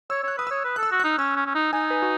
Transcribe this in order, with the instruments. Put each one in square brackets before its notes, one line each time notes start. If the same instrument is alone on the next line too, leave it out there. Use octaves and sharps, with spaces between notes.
[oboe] C#5 [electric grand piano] E6
[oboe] C#5 [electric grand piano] F#6
[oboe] B4 [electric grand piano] D#6
[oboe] C#5 [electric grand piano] E6
[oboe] B4
[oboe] A4 [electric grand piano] F#6
[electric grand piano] E6
[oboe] F#4
[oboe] D#4 [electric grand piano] F#6
[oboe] C#4 [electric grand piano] E6
[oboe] C#4
C#4
D#4
[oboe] D#4 [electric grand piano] G#5
[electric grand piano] B4
F#4